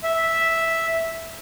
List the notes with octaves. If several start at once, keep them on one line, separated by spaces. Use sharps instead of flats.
E5